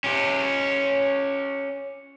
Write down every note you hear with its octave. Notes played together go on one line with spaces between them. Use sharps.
C#4 G4